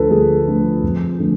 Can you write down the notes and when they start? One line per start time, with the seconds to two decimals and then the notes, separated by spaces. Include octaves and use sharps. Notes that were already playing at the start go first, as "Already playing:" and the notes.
Already playing: D2 D3 F3 A3 A4 B4
0.10 D2 G#4
0.47 D3 F3 A3
0.83 F2
1.19 D3 F3 A3